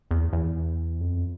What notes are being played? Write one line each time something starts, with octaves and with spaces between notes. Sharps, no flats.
E2
E2
F2